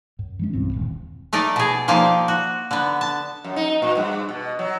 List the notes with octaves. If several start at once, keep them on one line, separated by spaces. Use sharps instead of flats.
F#2
E3 G#3 C#4
B1 G2 E3 C4
D#1 D#2
A3 D#4 A#4 D5
B2 G#4
F3 G3 A#3 D#4
F#4
D3 B3
A5
F#2
D#4
A#2
G2
B2
F#3